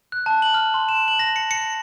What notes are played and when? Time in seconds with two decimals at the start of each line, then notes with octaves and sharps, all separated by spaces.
0.12 F#6
0.26 A5
0.42 F#7
0.54 F6
0.74 C6
0.89 E7
1.08 F#7
1.19 A#6
1.36 C#7
1.51 C#7